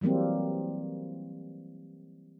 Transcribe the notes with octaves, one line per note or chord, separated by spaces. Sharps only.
E3 F#3 G3 A#3 C4